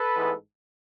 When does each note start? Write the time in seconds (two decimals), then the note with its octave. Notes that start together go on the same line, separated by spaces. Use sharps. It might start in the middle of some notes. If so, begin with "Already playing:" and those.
Already playing: A4 B4
0.16 A1 G#2 E3 G#3 B3